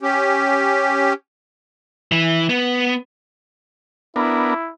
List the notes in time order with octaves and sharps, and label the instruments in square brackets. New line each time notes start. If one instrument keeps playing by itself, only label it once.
[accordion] C#4 G4
[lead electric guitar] E3
B3
[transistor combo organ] B3 D4 A#4 [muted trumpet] E4